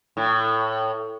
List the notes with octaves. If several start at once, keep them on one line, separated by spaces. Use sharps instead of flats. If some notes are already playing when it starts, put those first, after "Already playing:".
A2